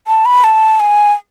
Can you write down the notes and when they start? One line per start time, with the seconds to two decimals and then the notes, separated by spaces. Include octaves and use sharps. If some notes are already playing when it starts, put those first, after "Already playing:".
0.07 A5
0.26 B5
0.44 A5
0.80 G#5